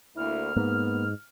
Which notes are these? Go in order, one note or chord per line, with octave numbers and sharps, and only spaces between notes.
D2 A#3 E4 F6
G#2 A#3 B3